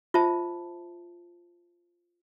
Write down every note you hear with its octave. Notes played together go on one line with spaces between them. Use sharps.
F4 C5 E5 A5